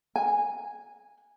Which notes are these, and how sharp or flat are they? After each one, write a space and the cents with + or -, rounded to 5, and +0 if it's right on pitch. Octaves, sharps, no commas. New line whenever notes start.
G#5 -10